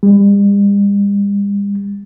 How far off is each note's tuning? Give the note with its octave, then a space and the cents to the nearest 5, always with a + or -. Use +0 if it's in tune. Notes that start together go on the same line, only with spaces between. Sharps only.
G3 +45